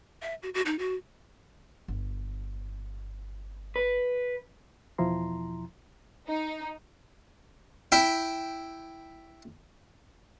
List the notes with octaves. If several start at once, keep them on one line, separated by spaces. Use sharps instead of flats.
E5
F#4
F#4
D#4
F#4
G1
B4
E2 B2 F3 E4 A#5 C6
D#4
E4 E5 G5